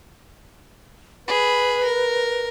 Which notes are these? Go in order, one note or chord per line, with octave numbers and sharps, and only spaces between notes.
G#4 B4 B5
A#4